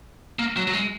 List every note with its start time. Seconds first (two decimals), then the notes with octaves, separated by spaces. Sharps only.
0.39 A#3
0.57 F#3
0.67 F#3
0.73 G#3